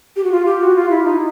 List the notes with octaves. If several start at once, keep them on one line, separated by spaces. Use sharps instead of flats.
G4
F#4
F4
G4
F#4
F4
E4
D#4